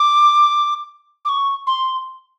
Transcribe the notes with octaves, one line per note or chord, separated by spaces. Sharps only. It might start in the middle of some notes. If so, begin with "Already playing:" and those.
Already playing: D6
D6
C#6
C6